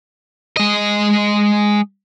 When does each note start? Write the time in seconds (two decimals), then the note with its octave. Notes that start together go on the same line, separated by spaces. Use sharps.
0.57 G#3 D#5